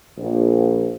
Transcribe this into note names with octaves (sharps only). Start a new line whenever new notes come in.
A#1